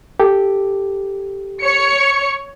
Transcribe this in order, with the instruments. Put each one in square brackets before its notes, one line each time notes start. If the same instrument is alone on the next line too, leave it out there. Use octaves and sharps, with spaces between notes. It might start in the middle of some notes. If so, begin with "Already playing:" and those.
[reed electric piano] G4 A4
[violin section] C#5 C#7